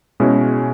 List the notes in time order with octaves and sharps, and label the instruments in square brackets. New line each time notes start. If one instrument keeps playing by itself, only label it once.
[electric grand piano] B2 G#3 C#4 E4